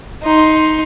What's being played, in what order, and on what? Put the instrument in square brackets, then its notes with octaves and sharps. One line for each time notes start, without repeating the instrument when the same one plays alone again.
[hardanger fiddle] D#4 C6